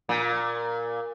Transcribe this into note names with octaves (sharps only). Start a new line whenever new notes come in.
A#2